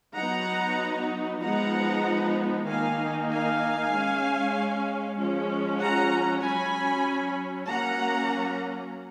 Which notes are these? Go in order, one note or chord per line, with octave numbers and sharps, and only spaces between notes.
F#3 B3 D#4 F#5 A#5
F3 G#3 B3 D#4 F#5 A#5
D#3 A#3 D#4 F5 G#5
F5 G#5
G#3 C#4
F3 G#3 C#4
F#5 A#5
F#3 C#4 G#5 B5
F#3 A#3 C#4 F#5 A#5